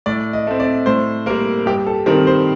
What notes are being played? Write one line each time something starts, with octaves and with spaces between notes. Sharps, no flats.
A2 D5
D#5
A3 C4
D5
A2 C5
G3 A#3 A#4
G2 G4
A4
D#3 G3 C4 A#4
C5